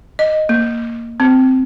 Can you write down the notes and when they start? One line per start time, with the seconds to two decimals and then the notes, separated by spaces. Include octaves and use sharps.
0.19 D#5
0.49 A#3
1.20 C4